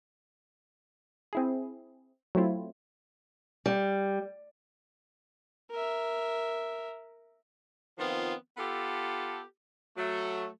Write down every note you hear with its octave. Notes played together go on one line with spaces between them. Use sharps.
C4 E4 G#4
F#3 A3 C4 E4 F4
G3
A#4 E5
D#3 F3 B3 C4 F4
B3 F4 G4 A4
F#3 A3